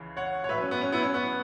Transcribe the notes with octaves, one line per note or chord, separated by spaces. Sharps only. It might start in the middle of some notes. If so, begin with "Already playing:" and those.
Already playing: C#2 C#3 E3
C#5 F#5
C#5
A2 F#3 B4 E5
C#4
B3
C#4
B3 E4
C#4
B3